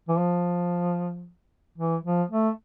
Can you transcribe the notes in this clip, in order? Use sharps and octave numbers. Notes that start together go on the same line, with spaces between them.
E3
F3
E3
F3
A3